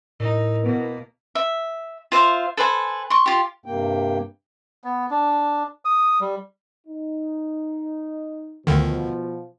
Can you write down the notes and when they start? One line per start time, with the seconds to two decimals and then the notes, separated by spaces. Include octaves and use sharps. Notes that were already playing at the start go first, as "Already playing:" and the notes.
0.20 A2 D#4 E4 A#4
0.63 B2 A#3 B3
1.35 E5
2.12 F4 C5 E5 F5
2.57 A4 B4 C5 G#5
3.10 C6 C#6
3.26 F4 G4
3.66 G2 C3 A#3 G5
4.84 B3
5.11 D4
5.85 D#6
6.21 G3
6.87 D#4
8.67 D2 B2 D3 D#3 F3